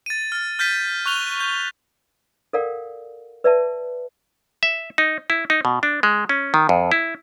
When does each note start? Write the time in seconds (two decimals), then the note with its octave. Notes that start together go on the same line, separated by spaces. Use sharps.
0.06 A6 D#7
0.32 F6 A6
0.59 F6 G6 A6 B6 D#7
1.06 C#6 F#6 F7 G7
1.40 G6
2.53 A4 A#4 D5 F5 F#5
3.44 B4 D5 E5 A5
4.63 E5
4.98 D#4
5.30 E4
5.50 D#4
5.65 B2
5.83 D4
6.03 G#3
6.29 C#4
6.54 D#3
6.69 F2
6.92 E4